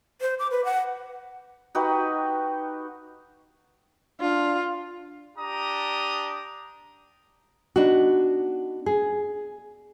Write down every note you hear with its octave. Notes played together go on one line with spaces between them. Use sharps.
C5
D6
B4
F#5
D#4 F#4 G4 B4
D4 F4
D4 G4 A#5 D#6
B3 D4 D#4 F#4
G#4